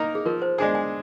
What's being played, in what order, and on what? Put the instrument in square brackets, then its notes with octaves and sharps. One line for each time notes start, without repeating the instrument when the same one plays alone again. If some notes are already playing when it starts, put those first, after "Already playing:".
Already playing: [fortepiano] A#3 D#4 A#4
[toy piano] G#4
[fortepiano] F3 [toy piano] A#4
[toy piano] C5
[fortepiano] G#3 D4 G#4 [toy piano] G#5
[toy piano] G#5